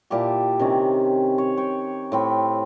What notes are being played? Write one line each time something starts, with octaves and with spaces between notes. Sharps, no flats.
A#2 E4 G4 A5
C3 D#3 C#4
C#5
C#5 G5
A2 C4 B5